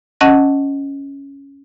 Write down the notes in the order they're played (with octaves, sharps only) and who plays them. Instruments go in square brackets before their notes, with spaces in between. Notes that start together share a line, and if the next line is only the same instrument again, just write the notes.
[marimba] C#4 D#5 F#5 A5 F#6 A#6